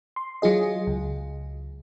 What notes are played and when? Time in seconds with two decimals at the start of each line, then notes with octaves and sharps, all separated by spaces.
0.16 C6
0.42 F#3 F4 G#4 D#5
0.87 C#2